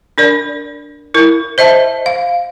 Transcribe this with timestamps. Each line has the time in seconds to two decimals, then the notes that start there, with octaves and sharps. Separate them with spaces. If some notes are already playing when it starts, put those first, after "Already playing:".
0.18 D4 A#4 D5
1.14 E4 A#4
1.58 C5 D#5 E5 A5
2.06 F5